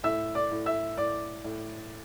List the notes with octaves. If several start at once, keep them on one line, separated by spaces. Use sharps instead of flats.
A2 E5 E6
D5 D6
A2
E5 E6
A2 D5 D6
A2